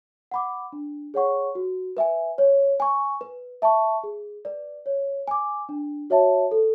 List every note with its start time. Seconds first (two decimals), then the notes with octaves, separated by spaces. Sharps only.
0.31 F#5 B5 D6
0.73 D4
1.14 G#4 C#5 F#5 C#6
1.55 F#4
1.97 B4 E5 G#5
2.38 C#5
2.80 G#5 C#6
3.21 B4
3.62 E5 A5 C#6
4.04 G#4
4.45 B4 D5
4.86 C#5
5.28 G#5 D6
5.69 D4
6.10 F#4 C#5 E5 A5
6.51 A4